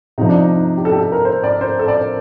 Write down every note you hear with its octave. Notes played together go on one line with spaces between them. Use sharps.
C3 F3 D#4
D4
D#4
D#4
G4
A4
G4
A4
A#4
C5
D5
C5
A4
D5
C5